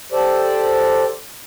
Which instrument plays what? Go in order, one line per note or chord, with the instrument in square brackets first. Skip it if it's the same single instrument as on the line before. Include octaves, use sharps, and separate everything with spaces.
[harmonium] G4 A4 C5 D5